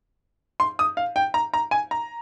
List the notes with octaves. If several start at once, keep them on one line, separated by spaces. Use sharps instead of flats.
C6
D#6
F5
G5
A#5
A#5
G#5
A#5